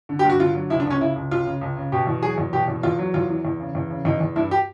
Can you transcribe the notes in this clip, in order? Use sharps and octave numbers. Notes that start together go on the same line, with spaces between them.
D3
G4
G2 F#4
D3 F4
F#3
C#2 E4
D4
C#2 C#4
C#3 E4
C#2
C#2 F4
C#3
C#2
C#3
B2 G4
E2
F#3 G#4
E2
B2 G4
E2
E2 F4
F#3
E2 F4
E3
E2
C#3
E2
C#3
E2 D#4
E2
G2 E4
G4